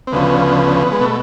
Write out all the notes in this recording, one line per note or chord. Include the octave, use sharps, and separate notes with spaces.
C4
D2 C#3 F3 B3
G#3
B2 A3